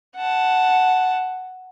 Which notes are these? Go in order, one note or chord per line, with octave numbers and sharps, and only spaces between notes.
F#5 A5